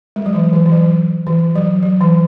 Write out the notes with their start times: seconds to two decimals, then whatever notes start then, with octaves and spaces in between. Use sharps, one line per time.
0.16 G#3
0.26 F#3
0.35 E3
0.53 E3
0.66 E3
0.72 F#3
1.27 E3
1.56 F#3
1.83 F#3
2.01 E3